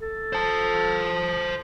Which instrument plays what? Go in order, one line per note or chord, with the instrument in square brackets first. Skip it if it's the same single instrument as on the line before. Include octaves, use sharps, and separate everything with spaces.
[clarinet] A4
[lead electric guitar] C5 A5